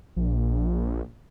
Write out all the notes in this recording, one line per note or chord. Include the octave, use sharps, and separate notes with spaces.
A#1